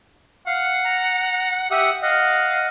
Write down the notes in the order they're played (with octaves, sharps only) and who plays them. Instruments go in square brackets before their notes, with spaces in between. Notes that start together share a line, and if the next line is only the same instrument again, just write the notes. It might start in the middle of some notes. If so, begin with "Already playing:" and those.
[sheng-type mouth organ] F5 [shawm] F#5
[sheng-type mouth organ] A#5
[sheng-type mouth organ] G4 E5 D#6 [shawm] F#5
[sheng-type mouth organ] D#5 F#5 [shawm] F5